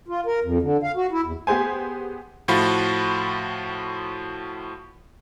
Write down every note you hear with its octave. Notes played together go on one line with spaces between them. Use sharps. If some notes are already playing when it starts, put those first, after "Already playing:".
F4
A#4
F2
D3
F5
F#4
E4
E2
B3 G4 G#4 C5 G#5
A2 F3 F4 F#4 B5